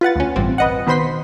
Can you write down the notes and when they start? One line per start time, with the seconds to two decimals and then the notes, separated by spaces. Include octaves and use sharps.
0.01 F4 B4 F#5 A6
0.16 D2 C#4
0.36 A1 G2 C4
0.58 B4 D#5 F#5
0.87 B2 D#3 B4 C5 C6 B6